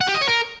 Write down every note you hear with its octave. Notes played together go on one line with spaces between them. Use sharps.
F#5
G4
D#5
C#5
A#4